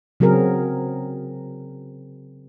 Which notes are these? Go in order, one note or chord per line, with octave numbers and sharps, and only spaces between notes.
C#3 F#3 C4 G#4 A#4